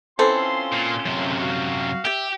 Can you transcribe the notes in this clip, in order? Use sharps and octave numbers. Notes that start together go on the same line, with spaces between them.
E3 C4 C#4 F4 A4 C6
A#2
F#2 C3
F#4 F5
G4 E5 G5